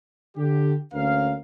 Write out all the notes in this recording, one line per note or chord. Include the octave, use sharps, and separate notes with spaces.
D3 G4
D2 A#3 C#4 A#4 F5